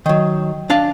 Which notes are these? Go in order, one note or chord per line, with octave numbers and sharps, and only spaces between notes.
D#3 F#3
D4 F5 A5